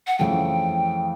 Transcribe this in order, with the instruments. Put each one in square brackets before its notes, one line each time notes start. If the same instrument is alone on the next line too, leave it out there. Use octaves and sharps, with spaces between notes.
[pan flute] F#5
[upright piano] F2 C#3 E3 A3 [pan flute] G5